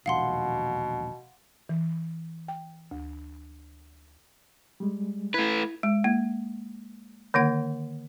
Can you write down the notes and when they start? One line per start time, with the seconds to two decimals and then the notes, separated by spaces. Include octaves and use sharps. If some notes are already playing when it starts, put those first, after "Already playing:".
0.06 E1 A#1 D#2 B2 F5 F#5 C6
1.69 E3
2.48 G5
2.91 D2
4.80 G3 G#3
5.34 A3 E4 B4 G#6
5.83 G#3
6.04 A#3
7.34 D3 D#3 A#3 F#5